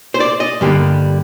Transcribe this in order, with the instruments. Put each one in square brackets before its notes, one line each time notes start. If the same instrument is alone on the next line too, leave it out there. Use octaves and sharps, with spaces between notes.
[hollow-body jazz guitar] C5
D5
D#5
G2 D3 G3 A#3